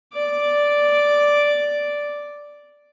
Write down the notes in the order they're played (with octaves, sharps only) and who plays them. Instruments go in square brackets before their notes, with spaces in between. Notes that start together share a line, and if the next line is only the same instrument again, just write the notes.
[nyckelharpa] D5 D6